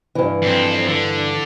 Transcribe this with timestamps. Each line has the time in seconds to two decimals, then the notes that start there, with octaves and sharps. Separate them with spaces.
0.15 G2 E3
0.42 F2 C4
0.87 D3